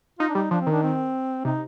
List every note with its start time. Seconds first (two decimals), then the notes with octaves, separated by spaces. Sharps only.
0.19 D#4 F4
0.29 D4
0.35 G3 D#4
0.51 F3 D4
0.61 C4
0.66 D#3
0.72 D4
0.83 C4
1.45 C3 D#4